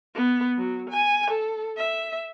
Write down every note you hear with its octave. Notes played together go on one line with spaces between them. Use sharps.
B3
F#3
G#5
A4
E5